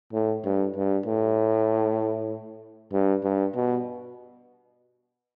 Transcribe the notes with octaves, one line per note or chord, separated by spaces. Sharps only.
A2
G2
G2
A2
G2
G2
B2